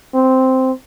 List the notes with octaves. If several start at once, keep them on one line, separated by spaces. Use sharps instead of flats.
C4